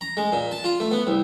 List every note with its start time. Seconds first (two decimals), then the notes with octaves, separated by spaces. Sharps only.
0.01 A#5
0.17 G#3
0.32 A#2
0.51 A5
0.64 F4
0.80 A3
0.91 B3
1.07 C2